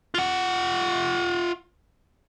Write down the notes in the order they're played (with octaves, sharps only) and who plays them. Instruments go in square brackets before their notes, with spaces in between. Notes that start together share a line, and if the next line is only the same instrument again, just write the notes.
[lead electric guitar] F4 F#5